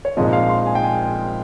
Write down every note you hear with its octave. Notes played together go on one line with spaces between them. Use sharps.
C#5
A#1 G#2 F3 C4 D#5
F5
C6
G#5
G5
G#5